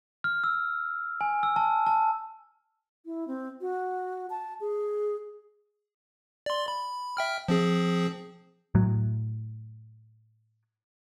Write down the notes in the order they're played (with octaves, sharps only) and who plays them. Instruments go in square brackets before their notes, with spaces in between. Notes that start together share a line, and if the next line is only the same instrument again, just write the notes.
[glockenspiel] F6
E6
G#5
E6
A5
A5
[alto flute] E4
C4
F#4
A5
G#4
[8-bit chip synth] D5 C6
B5
E5 G5 F6
F3 C4 G#4
[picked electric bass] A2 F#3